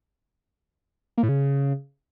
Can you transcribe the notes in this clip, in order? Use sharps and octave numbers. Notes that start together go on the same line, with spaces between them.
A#3
A2
C#3